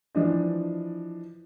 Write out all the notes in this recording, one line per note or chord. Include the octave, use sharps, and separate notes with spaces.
E3 F3 D4 D#5